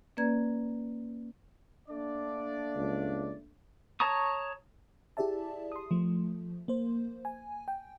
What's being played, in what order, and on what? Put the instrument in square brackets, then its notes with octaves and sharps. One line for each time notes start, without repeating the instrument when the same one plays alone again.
[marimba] A#3 C#4 B4 D5 A#5 G#6
[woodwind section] A3 A#3 D4 [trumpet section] D5
[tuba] C#2
[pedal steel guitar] C#5 A5 A#5 C#6 D#6
[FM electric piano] E4 G4 G#4 D5 E5 A5
C6 D#6
F3 A3
A#3 C5
G#5
G5